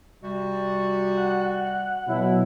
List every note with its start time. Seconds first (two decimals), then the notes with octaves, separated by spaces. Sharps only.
0.23 C3 G3 F#4
1.18 F#5
2.07 B2 F#3 E4